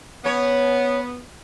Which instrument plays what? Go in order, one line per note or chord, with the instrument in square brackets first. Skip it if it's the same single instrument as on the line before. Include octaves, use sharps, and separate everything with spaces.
[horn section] B3 [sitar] C#4 C#5